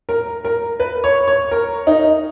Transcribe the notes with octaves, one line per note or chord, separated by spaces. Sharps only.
A#4
A#4
B4
C#5
C#5
A#4
D#4